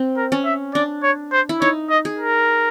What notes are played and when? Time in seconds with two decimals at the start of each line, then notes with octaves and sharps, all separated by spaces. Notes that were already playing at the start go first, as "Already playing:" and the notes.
Already playing: C4
0.17 A#4
0.32 C#4
0.46 E5
0.74 D4 D5
1.03 C#5
1.32 C5
1.49 E4
1.61 D#4 C#5
1.90 D#5
2.05 G#4
2.19 A#4